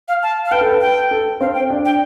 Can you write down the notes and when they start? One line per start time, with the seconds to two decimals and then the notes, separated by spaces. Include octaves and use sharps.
0.08 F5
0.23 A5
0.46 F5
0.51 B4 G5
0.61 A4
0.71 B4
0.81 G5
1.11 A4
1.41 C4 F5
1.54 G5
1.70 D4
1.85 G5